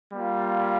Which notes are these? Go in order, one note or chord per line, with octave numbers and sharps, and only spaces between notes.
G3 A#3 F4